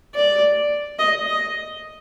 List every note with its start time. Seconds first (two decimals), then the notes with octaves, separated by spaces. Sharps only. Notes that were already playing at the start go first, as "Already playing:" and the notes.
0.15 D5
0.99 D#5
1.26 D#5